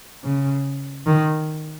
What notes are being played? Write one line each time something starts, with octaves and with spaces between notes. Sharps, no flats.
C#3
D#3